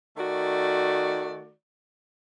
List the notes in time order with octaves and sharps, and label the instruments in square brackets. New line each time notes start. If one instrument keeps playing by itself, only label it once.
[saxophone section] D#3 A3 F#4 D5